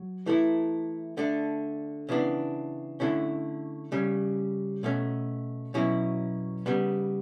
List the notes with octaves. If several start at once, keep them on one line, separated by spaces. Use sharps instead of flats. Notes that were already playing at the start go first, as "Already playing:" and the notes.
Already playing: F#3
E3 A3 E4
D3 A3 D4
C#3 E3 B3 D4
D3 A3 C#4 E4
C#3 G3 C#4
B2 A3 C#4
B2 F#3 C#4 E4
C#3 G3 B3